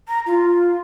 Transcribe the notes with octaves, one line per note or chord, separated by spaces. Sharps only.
A#5
F4